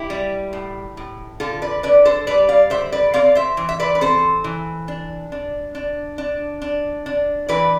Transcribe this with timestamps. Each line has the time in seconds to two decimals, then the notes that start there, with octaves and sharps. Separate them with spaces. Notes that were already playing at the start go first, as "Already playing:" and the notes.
Already playing: E4 G4
0.10 G3
0.53 A2
0.97 A2
1.40 D3 F4 A4
1.62 B4 D5
1.83 D4 B4 D5
2.05 A4 C5
2.27 G3 B4 D5
2.49 D5 F5
2.70 D3 C5 E5
2.92 B4 D5
3.14 C4 D5 F5
3.35 C5 E5
3.57 E3
3.69 E5
3.80 B4 D5
3.95 B4
4.01 C4 A4 C5
4.44 E3
4.88 D4
5.32 D4
5.75 D4
6.18 D4
6.62 D4
7.06 D4
7.48 E3 B4 D5